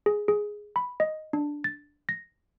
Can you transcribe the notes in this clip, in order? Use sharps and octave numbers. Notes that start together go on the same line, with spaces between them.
G#4
G#4
B5
D#5
D4
A6
A#6